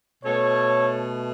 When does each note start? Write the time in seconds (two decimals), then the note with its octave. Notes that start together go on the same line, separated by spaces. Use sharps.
0.24 B2 A3 A4 C#5